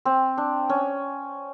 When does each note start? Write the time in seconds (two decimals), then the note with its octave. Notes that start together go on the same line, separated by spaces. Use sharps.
0.05 C4
0.38 D4
0.69 C#4